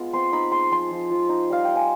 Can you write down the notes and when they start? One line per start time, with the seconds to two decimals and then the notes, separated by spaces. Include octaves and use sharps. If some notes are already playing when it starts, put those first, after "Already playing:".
Already playing: G#3 B3 F4
0.13 C4 C6
0.32 D#4 B5
0.52 G#3 C6
0.71 F3 C6
0.91 F3
1.11 F3
1.29 D#4
1.49 G3 F5
1.65 G3 G5
1.75 G#5